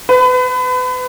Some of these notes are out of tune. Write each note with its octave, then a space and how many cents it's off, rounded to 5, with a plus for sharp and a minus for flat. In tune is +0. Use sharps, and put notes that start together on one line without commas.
B4 +30